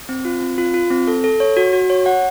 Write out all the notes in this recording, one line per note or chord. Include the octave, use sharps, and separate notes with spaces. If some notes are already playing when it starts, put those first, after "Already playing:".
C4
F4
C4
F4
F4
C4
A4
A4
C#5
F#4
F#4
C#5
F#5